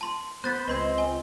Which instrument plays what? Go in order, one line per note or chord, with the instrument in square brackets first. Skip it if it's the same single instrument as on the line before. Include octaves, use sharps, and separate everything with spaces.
[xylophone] A5 C6
[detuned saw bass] B3 [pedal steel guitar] C5 [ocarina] B5 [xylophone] F#6 A6 B6
[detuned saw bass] C#2 [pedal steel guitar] C4 C5 [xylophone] B4 C6 G#6 [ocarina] D#5
[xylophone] G#5 G7